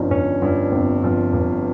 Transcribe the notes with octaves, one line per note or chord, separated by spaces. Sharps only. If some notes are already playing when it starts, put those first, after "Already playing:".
Already playing: G1 G2 F3 C#4 D#4
G1 C#4
G2 F3
G1 C4
G2 F3
G1